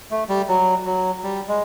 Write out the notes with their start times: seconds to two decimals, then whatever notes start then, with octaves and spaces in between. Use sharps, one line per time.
0.11 A3
0.29 G3
0.49 F#3
0.85 F#3
1.23 G3
1.48 G#3